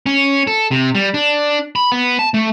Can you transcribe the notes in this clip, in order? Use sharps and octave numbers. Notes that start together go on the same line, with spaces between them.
C#4
A4
C3
G3
D4
B5
B3
A5
A3